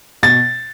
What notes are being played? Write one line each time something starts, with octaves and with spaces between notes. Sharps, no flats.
B2 A6